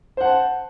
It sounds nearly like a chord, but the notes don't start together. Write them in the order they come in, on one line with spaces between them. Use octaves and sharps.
C5 F#5 A5